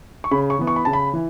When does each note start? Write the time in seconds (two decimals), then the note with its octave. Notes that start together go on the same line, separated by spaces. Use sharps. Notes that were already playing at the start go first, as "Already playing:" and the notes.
0.24 C#6
0.31 C#3 B5
0.50 C#6
0.59 E3 B3
0.67 C#6
0.76 B5
0.85 C#3 A5
0.93 B5
1.13 E3